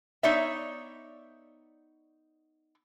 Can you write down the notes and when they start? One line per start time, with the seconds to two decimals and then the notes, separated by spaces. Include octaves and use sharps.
0.23 B3 D#4 C#5 D5 E5